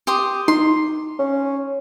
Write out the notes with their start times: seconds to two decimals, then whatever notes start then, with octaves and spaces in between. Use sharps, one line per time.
0.07 G4 C6 D#6
0.48 D#4 C6
1.19 C#4